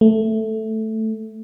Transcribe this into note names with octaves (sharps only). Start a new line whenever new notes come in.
A3